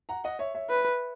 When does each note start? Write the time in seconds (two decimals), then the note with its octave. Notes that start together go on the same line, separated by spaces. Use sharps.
0.09 F#5 A#5
0.24 D#5 F#5
0.39 C#5 E5
0.55 C#5 E5
0.70 B4